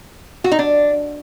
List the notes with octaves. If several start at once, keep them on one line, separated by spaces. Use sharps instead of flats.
F#4
D#4
D4